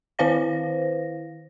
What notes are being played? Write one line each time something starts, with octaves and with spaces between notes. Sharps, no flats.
D#3 E4 B4 C5 F5 A#6